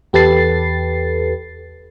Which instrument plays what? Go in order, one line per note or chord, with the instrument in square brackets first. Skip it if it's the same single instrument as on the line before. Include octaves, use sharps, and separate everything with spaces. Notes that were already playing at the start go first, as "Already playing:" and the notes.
[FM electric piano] E2 G4 A4 B4 A6 C7